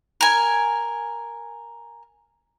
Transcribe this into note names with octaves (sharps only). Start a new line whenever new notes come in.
A#4 G#5